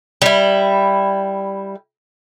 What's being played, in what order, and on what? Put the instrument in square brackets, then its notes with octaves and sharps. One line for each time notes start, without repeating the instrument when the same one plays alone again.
[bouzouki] G3 E4